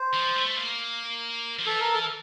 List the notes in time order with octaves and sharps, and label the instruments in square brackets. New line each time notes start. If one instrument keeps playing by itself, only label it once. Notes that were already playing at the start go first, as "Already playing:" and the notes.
Already playing: [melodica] C5
[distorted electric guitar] F3
A3
A#3
F3
[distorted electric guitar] E3 [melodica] A4
[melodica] A#4
A4